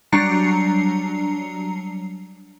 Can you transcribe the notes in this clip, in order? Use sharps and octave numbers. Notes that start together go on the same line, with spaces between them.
F#3 G3 D4 A#5 C7 C#7